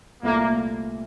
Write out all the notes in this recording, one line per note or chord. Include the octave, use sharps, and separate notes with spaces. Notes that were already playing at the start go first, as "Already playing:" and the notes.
C2 A#2 A3 A#3 E4 A4